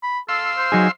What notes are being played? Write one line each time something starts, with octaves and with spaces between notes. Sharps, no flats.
B5
A4 F5 C6 E6
C5
F#3 D#4 G#4